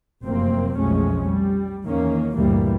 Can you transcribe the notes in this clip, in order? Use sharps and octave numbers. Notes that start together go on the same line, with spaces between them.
F1 F#2 C3 A#3 C4
B1 F2 G#3 A3 C#4
G3
E2 D#3 A#3 C#4
D2 G2 A#2 E3 G3 A#3